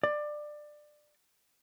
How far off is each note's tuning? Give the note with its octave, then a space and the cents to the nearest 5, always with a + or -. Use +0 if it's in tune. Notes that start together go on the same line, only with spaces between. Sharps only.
D5 +20